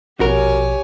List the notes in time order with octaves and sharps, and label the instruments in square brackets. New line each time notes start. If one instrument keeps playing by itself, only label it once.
[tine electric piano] A#1 B2 [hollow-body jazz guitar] F#4 A#4 [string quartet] G4 C#5 G#5